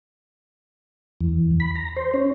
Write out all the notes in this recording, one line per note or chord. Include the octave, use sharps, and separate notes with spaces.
E2
B5
A#5
C5
C#4